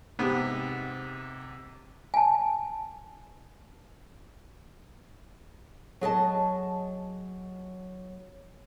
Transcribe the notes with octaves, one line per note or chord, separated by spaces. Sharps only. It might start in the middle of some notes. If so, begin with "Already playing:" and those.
G#2 C3 B3 G4
G#5 A5
F#3 G#4 D#5 A5